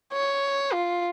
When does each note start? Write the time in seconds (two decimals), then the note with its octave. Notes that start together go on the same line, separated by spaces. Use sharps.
0.13 C#5
0.73 F4